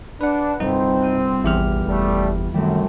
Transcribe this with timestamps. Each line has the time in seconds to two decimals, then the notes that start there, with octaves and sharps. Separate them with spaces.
0.21 D4 B4 F#5
0.60 G1 C2 C4 D#4
1.01 F6 G6 D#7
1.44 A1 E2 E3 G4 F6
1.87 F#1 G3 A3
2.54 F#2 D#3 G3 A3 C4